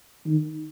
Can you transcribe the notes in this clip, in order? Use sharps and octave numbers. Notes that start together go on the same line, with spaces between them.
D#3